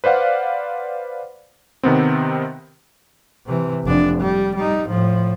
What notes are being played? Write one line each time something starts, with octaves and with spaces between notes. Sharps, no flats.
B4 C5 D5 F5 F#5
C3 D#3 B3 C4
C3 E3
F1 D4
G3
G3 D#4
A2 F3